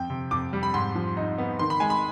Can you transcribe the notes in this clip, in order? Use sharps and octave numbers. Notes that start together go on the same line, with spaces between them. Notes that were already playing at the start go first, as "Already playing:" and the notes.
Already playing: F2 G5
C3
F2 D6
G3
B5
G#2 C6
F3
D#4
B3
D#3 C6
B5
G#3 G#5
B5